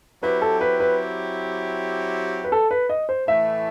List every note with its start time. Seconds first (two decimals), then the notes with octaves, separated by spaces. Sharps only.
0.23 F#3 C4 E4 G4 B4
0.42 A4
0.61 B4
0.80 B4
2.44 B4
2.52 A4
2.71 B4
2.89 D#5
3.09 C5
3.27 A2 E3 A3 E5